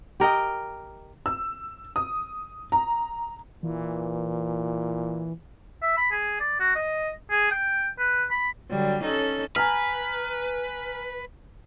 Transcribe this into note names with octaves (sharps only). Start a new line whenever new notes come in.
G4 A#4 D#5 G5
E6
D#6
A#5
A#2 E3
E5
B5
G#4
D5
F#4
D#5
G#4
G5
B4
B5
D3 F#3 G3
C#4 D#4 A4
B4 G#5 A#5 F6